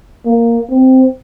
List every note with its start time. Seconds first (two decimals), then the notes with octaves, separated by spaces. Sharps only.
0.26 A#3
0.70 C4